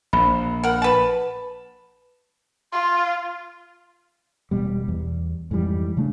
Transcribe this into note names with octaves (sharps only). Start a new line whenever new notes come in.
A#1 B5
A#4 F#5
B4 A5
F4 C6
E1 B2 G3
E2
F2 G#2 E3 G3
C#3 A3 D4